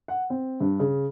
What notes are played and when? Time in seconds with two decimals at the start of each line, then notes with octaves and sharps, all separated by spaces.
0.08 F#5
0.30 C4
0.60 G2
0.80 C#3